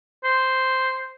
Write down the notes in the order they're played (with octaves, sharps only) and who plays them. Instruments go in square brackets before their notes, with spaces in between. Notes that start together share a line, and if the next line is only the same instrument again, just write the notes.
[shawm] C5